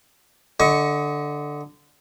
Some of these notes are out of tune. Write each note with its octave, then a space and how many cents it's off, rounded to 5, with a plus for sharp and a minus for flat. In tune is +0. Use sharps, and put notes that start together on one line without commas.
D3 +0 D#5 +30 C#6 +0